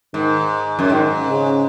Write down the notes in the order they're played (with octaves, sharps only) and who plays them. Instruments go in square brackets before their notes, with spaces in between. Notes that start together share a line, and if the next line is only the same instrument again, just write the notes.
[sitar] G#2 [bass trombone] D#3
[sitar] F#2
[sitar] G#2 [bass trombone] D#3
[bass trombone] C#3